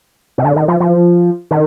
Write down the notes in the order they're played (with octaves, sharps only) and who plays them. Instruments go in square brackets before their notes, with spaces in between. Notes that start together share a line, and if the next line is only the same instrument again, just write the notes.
[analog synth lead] C3
D3
D#3
F3
F3
D#3